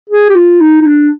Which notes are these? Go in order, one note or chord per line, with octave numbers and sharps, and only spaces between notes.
G#4
G4
F4
D#4
D#4
D4